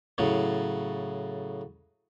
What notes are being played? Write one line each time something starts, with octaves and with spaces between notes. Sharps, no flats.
A2 C#3 F#3